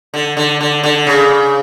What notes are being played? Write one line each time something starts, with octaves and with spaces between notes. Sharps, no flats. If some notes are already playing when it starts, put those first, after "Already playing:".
D3
D3
D3
D3
C#3